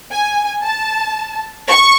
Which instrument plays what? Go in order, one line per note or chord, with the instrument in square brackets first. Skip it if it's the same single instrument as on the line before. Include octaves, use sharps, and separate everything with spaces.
[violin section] G#5
A5
C#6